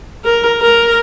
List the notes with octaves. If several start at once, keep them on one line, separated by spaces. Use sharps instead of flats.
A#4
A#4